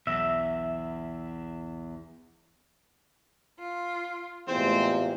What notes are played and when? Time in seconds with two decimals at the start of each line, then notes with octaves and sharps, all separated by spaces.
0.07 B1 E2 E5
3.60 F4
4.48 E2 A2 C3 G#3 C4 F4 C5